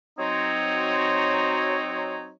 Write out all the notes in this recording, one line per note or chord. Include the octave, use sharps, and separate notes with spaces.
F#3 C4 D#4 C#5